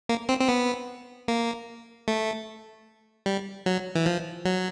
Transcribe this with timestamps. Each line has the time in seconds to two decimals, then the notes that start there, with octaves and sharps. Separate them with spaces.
0.09 A#3
0.29 C4
0.41 C4
0.49 B3
1.28 A#3
2.08 A3
3.26 G3
3.66 F#3
3.95 E3
4.06 F3
4.45 F#3